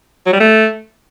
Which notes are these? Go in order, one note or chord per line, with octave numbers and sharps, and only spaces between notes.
F#3
G3
A3